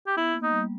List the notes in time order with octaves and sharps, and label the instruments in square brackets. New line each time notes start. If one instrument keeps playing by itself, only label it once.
[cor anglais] G4
[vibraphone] B3 [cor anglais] E4
[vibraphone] A#3
[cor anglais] D#4
[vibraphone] G3